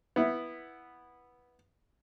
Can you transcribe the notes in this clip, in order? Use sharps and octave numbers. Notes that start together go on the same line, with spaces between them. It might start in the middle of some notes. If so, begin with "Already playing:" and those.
B3 E4